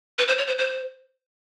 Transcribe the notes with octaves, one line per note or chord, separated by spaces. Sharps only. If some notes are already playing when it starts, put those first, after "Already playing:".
B4
C5
C#5
C5
C5